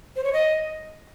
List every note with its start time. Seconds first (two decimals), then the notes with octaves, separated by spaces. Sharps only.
0.16 C5
0.24 C#5
0.33 D#5